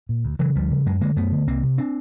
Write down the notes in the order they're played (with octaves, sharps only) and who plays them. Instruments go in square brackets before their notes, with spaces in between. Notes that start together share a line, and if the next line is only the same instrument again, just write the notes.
[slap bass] A#2
D2
C#3 E3 F#3
D2 F3 G3
C#3
F#2 F#3 G#3
D3 G#3 A#3
F#2 A3 B3
D3
C2 A#3 C4
C3
C4 D4